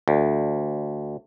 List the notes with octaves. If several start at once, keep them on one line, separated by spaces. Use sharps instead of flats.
D2